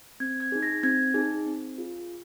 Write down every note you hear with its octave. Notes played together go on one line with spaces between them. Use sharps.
C4 G#6
G#6
D#4 G#4
A#6
C4 G#6
D#4 G#4
C4
F4 G#4